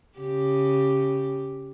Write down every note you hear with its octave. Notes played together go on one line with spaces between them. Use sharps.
C#3 G4